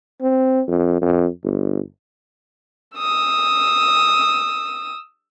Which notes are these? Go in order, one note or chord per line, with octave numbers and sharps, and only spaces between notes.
C4
F2
F2
G1
D#6 E6